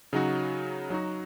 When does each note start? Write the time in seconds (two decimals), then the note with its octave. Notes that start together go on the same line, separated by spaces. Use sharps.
0.13 C#3 F#3 D#4 F#4
0.90 F#3 D#4 F#4